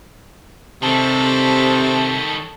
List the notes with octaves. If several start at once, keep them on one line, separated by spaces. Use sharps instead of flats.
C3 D#3 G3 A4 A5 C#6